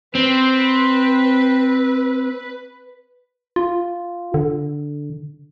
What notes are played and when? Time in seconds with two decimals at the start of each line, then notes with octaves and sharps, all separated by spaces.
0.15 C4 B4
3.56 F4
4.34 D3